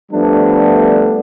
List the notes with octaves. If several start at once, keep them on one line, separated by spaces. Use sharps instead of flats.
F3 G3 A3 B3 D4